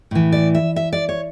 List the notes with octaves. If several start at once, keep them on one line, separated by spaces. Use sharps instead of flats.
A2 E3
D5
E5
E5
D5
C#5